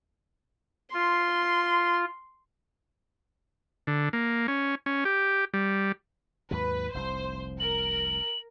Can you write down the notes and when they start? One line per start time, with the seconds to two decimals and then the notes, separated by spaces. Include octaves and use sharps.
0.93 F4 C6
3.87 D3
4.13 A#3
4.48 C#4
4.86 C#4
5.05 G4
5.54 G3
6.51 D#2 G#2 F#3 B4
6.94 F1 C2 C5
7.60 A#4 F#7